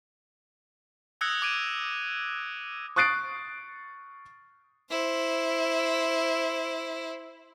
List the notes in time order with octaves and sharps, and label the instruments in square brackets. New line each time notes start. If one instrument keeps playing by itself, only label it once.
[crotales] D#6 E6 F#6 G#6 A#6 C#7
D6 G#6 D7 D#7
[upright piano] C#6 D#6 F#6 A6 C7 D7
[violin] E4 C5